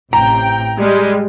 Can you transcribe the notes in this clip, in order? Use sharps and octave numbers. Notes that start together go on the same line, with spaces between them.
A1 C3 G5 A#5
G3 G#3